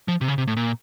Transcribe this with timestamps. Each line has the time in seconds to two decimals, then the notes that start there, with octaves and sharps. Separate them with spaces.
0.08 F3
0.21 C3
0.28 C#3
0.38 C3
0.47 A2
0.57 A#2